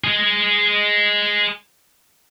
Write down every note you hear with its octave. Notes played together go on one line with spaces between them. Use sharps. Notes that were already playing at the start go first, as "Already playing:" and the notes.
G#4 D#5